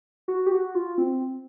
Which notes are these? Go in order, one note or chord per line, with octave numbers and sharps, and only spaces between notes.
F#4
G4
F#4
F4
C4